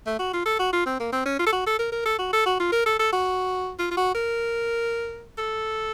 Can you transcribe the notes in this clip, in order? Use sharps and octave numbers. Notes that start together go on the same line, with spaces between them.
A3
F#4
F4
A4
F#4
F4
C4
A#3
C4
C#4
F4
A4
F#4
A4
A#4
A#4
A4
F#4
A4
F#4
F4
A#4
A4
A4
F#4
F4
F4
F#4
A#4
A4